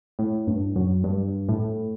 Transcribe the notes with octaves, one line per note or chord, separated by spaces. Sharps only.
A2
G2
F#2
G2
A2